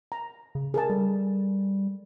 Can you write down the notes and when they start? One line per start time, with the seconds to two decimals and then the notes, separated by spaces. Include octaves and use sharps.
0.12 A#5
0.55 C#3
0.74 G#4 A#4 A5
0.90 G3 A4